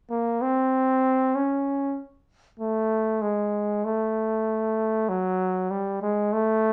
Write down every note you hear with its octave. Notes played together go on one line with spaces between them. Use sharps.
A#3
C4
C#4
A3
G#3
A3
F#3
G3
G#3
A3